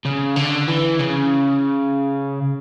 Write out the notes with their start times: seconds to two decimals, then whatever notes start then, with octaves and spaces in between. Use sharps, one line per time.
0.05 C#3
0.36 D3
0.68 E3
0.99 C#3